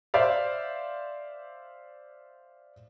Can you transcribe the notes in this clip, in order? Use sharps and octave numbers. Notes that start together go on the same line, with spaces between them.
C5 D5 E5 F5